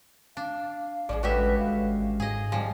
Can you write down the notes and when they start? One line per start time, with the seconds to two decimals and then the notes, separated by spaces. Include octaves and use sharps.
0.37 D4 F5
1.09 A1 F3 G#4 C#5 D5
1.23 D3 G#3 C#4 F#4 G4 B4 E5
1.58 G#1 F5
2.20 G#2 G#4 D#5
2.52 D#2 F3 G3 G4 G#5